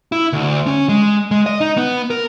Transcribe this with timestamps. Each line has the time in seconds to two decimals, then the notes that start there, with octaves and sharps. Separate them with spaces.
0.12 E4
0.33 D2
0.66 C#4
0.89 G#3
1.31 G#3
1.46 D#5
1.61 D#4
1.77 B3
2.10 A#4